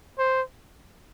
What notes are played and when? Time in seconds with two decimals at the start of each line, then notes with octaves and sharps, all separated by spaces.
0.18 C5